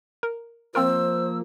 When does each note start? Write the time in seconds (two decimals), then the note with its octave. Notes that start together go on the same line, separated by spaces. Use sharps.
0.23 A#4
0.75 F3 A#3 C4 F4 A#4 C5 E6